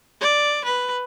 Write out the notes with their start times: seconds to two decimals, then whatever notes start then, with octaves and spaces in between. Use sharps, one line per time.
0.21 D5
0.64 B4